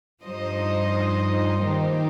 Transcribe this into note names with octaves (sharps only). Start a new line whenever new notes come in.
G2 F3 D#4 C5 D#5
D#3 A#3 D#4 G4 C5